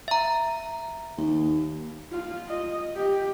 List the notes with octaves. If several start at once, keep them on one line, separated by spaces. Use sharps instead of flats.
E5 A#5
D#2
F4
D#5
G4